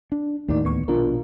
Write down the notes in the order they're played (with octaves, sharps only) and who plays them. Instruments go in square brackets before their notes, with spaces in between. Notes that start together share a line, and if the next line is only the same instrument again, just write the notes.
[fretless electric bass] D4
[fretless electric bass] D#2 A2 [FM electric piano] A#3 D#4 D5
[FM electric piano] D2 B3 C#6
[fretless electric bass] A#1 B2 D4 [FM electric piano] F4 A#4